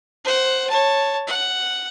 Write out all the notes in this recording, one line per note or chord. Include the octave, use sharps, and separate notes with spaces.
C5 F#5
C#5 A5
F#5